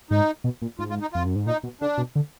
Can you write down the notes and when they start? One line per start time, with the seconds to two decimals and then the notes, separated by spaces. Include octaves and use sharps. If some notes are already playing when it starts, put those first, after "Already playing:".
0.11 G#2 D#4
0.44 B2
0.62 A#2
0.79 G#2 F4
0.90 F4
1.01 D#4
1.13 F2 F4
1.26 F#2
1.36 G#2
1.46 A#2 D#4
1.63 B2
1.81 D3 D4
1.98 B2
2.16 D3